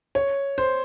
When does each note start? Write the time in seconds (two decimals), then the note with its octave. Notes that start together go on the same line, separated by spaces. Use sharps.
0.15 C#5
0.58 C5